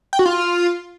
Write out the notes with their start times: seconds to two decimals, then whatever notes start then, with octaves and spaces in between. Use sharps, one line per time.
0.13 G5
0.19 F#4
0.26 F4